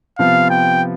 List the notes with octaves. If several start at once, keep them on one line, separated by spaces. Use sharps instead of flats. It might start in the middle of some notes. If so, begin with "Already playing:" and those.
C3 F3 B3 F4 F5
G5